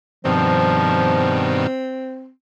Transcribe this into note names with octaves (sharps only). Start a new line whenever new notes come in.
G2 B2 D#3 F3 C4